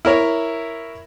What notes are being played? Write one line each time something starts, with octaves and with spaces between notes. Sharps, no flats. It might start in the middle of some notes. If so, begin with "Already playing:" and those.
E4 A#4 C#5